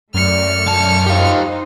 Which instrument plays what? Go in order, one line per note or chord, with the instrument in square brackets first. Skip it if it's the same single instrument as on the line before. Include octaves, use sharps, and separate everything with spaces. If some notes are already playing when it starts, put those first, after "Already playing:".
[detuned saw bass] F#2 [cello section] A3 D5 [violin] F6 C#7
[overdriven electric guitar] B1 A5
[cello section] D#4 F4 C5 [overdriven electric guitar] G4 F5